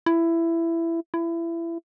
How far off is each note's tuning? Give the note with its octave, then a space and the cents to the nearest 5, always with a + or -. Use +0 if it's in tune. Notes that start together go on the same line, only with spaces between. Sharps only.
E4 +15
E4 +25